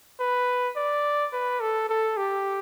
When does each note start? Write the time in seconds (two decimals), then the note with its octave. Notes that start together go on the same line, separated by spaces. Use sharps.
0.20 B4
0.76 D5
1.33 B4
1.61 A4
1.89 A4
2.17 G4